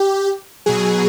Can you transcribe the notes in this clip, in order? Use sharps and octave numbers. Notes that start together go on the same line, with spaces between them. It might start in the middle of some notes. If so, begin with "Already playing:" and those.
Already playing: G4
B2 F#3 G#4